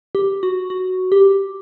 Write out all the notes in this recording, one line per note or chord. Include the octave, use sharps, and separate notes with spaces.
G4
F#4
F#4
G4